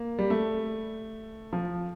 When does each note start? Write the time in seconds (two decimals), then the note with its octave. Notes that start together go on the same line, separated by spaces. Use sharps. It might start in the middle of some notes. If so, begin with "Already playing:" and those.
Already playing: A#3
0.19 G3
0.30 A3
1.53 F3